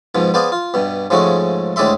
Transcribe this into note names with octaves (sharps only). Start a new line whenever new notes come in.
G#2 B2 F3
B3 G#4 C5 D5 F5
F4
G2 B2
G#2 C#3 F3 G#3 A3 F#4
D2 A2 G#3 D5 E5 C6